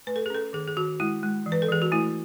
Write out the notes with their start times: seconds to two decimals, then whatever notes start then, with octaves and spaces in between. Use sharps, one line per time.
0.07 A3 B4
0.16 A4
0.26 G#4
0.30 C#4 A4
0.53 D#3 G#4
0.67 G#4
0.77 D#3 F#4
1.00 G#3 E4
1.23 G#3
1.46 E3
1.52 B4
1.62 A4
1.69 E3 G#4
1.82 F#4
1.92 A3 E4